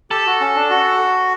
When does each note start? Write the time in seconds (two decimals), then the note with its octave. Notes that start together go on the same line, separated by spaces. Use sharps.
0.10 G4 A4
0.26 F#4
0.41 C#4
0.55 D4
0.70 F#4